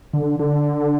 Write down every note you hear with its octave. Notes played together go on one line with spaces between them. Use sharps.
D3
D3